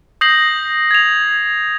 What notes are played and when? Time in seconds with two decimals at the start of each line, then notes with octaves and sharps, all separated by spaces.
0.21 D#6 G6 A#6 C7 F#7
0.91 G#6 F7